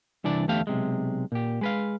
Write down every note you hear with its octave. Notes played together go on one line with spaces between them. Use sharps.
C2 E3 D4 D5
E2 D3 A3 G4 F5
B1 C3 G#3
A#2 G4
G#3 B4 F5